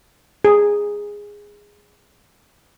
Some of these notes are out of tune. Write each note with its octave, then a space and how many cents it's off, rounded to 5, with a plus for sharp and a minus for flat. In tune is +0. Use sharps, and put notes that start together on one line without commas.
G#4 -10